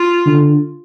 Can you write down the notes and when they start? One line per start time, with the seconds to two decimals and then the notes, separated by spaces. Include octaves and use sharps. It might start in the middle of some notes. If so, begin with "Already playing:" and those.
Already playing: F4
0.26 D3